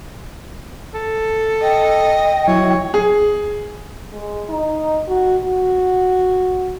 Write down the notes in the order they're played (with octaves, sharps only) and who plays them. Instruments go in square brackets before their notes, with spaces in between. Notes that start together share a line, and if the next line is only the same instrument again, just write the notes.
[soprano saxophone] A4
[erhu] D#5 [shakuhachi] G5
[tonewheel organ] F#3 E4 [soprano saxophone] C#5
[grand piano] G#4
[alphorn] G#3
D#4
F#4
F#4